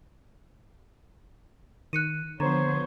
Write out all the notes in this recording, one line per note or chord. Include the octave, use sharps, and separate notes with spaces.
D#3 F#6 C#7 D#7
D3 F3 B3 C5 C#5 A#5